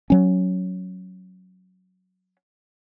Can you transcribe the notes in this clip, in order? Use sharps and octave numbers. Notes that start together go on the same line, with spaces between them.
F#3 C#4